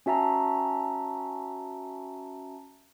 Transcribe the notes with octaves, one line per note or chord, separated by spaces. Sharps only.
C#4 F#4 E5 A5 A#5